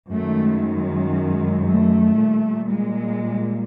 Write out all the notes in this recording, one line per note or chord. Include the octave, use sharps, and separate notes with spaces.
F#2 D#3 G#3 A3
A3
A#2 G3
G#3